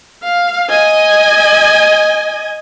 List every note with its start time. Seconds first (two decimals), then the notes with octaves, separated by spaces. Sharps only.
0.24 F5
0.70 D#5 G#5